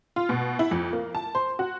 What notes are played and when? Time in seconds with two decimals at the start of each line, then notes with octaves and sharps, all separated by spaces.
0.16 F4
0.29 B2
0.59 E4
0.71 F2
0.93 A#3
1.15 A5
1.35 C5
1.59 F#4